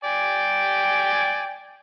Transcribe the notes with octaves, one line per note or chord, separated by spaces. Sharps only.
D5 G5 G#5